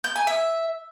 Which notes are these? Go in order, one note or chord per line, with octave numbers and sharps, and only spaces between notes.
G6
G#5
E5